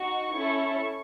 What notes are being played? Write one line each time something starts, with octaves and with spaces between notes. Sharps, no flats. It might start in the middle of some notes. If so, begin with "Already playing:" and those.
Already playing: D#4 F#4 C#6
C#4 E4 A4